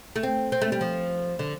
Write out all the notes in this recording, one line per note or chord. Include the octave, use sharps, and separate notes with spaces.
A3
C4
C4
A3
G3
F3
D3